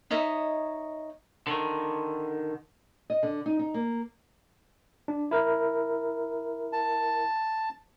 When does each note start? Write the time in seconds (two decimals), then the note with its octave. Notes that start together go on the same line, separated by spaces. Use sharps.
0.11 D#4 C#5 D#5 E5
1.47 D3 D#3
3.10 D#5
3.23 D3
3.46 D#4
3.59 D#4
3.74 A#3
5.08 D4
5.31 E4 A#4
6.73 A5